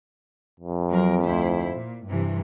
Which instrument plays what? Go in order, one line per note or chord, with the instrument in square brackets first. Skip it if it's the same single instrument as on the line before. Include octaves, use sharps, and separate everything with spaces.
[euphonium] F2
[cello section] F#3 C4 A#4
D2 E4 C5
A#2
G2 C3 E3